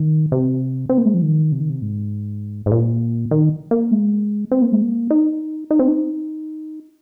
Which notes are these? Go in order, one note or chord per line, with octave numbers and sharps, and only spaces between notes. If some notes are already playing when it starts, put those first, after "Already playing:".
Already playing: D#3
C3
C4
A#3
G#3
F3
D#3
C3
D#3
C3
G#2
G#2
A#2
D#3
A#3
G#3
C4
A#3
G#3
A#3
D#4
D#4
C4
D#4